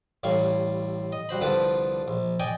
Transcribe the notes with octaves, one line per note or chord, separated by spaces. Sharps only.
A1 A2 G3 F5 C#6
D#5
G3 F#4 C5 B5
C2 D3 F3 B4 A5 D6
A#1
D5 D#5 G5 G#5